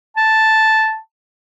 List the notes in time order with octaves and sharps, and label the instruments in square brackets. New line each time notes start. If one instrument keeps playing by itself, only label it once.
[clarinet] A5